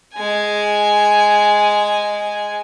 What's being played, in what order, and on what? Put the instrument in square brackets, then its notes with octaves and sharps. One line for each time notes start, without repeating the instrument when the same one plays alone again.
[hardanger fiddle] G#3 G#5